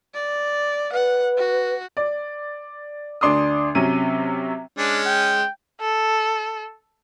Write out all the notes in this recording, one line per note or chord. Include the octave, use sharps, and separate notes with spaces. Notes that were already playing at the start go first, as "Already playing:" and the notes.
D5
B4 F#5
F#4
D5
D2 D4 C6 D6 D#6
C3 F#3 C#4 D#7
G#3 C#4 D4
G5
A4